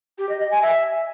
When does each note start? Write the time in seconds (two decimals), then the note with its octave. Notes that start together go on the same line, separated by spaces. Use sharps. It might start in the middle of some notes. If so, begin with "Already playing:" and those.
0.18 G4
0.29 D#5
0.40 D#5
0.51 G#5
0.62 E5